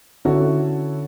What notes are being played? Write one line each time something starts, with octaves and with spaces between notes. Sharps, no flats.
D3 C#4 E4 F#4 A4 C#5